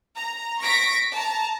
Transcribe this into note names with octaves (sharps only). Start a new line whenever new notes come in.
A#5
C#6 A#6 B6 D7
A5 A#5